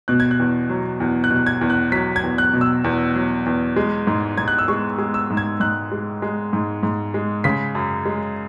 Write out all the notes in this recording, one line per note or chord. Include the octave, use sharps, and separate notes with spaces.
B2 F#6
G#6
F#6
E2
F#3
E2
F#6
B2
F#6
G#6
E2
F#6
F#3 B6
G#6
E2
F#6
B2
E6
E2
F#3
E2
G#3
G#2
G#2 G#6
F#6
E6
G#3 C#6
G#3
E6
G#2
G#6
G#2 F#6
G#3
G#3
G#2
G#2
G#3
C#3 B6
F#2
G#3